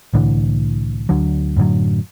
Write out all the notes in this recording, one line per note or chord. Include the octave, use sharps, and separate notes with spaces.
C2 A2 D3 E3
D2 D3 F#3
F#2 A2 D3 F#3